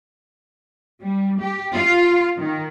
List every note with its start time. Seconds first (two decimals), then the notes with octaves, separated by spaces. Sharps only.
1.02 G3
1.39 G4
1.74 F4
2.38 D#3